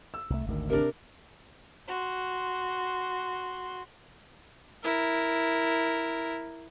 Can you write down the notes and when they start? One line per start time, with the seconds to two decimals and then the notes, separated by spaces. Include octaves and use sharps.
0.14 E6
0.30 C2 A3
0.46 G#1 D2 D#3
0.70 C3 D4 A#4
1.88 F#4 C6
4.83 E4 A#4